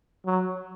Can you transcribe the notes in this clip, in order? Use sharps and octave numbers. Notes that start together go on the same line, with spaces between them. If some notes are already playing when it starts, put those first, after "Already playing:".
F#3